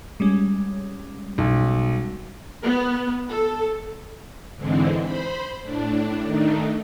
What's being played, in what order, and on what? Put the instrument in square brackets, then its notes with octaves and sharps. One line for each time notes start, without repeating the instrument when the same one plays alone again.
[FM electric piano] G3 G#3 C#4
[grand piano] B1
[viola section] B3
A4
[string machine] G#2 D3 E3 G#3 C4
C5 B5
A2 D4
D#3 A3 D4 D#4